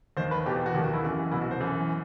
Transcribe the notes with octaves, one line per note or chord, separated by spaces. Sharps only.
D#2 D#3 C5
B4
E2 B2 G4
F#4
D#2 D#3 G4
F#4
E4
F#2 E3
C2 B2 E4
F#4
C5
F#2 E3